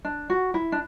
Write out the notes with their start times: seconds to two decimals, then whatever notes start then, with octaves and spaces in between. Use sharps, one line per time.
0.05 D4
0.30 F#4
0.54 E4
0.72 D4